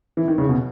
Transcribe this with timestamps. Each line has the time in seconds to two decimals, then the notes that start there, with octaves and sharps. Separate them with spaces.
0.17 E3
0.28 D#3
0.38 C#3
0.49 B2